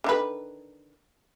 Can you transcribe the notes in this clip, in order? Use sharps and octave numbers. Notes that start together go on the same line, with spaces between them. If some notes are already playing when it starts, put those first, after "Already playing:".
D3 D#3 B4